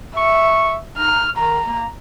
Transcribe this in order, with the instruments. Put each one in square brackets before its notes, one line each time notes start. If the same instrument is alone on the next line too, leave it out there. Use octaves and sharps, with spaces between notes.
[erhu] E5 [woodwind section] C#6
[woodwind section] D#4 [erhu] F6
[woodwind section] D#3 [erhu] A#5
[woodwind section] A#3